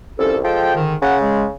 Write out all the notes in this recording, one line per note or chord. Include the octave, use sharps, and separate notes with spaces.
C2 F3 C#4 A4
F3 G#3 A4 G5
G#2 D3 D#3
C#3 F#5
G#3